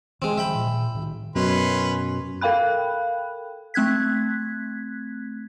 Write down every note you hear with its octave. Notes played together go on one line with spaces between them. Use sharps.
E3 G#3 C4
D#3 F3 E5 G5 B5
A#2
A2 D#3
F#2 B2 C#4 B4 C6
A4 A#4 F5 G5 B5 F#6
A3 C4 F#6 G#6 B6